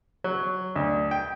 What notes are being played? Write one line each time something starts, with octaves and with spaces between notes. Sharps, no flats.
F#3
D2
G5